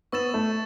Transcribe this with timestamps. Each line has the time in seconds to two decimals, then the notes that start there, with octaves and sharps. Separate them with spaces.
0.12 B3 C#6 E6 A6 E7
0.34 A3